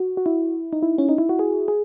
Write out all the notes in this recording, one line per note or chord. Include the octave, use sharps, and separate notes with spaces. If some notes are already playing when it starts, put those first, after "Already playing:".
Already playing: F#4
F#4
E4
D#4
E4
C#4
D#4
E4
F#4
G#4
G#4